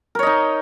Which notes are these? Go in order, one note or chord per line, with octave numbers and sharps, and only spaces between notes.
D#4 A#4 C#5 D#5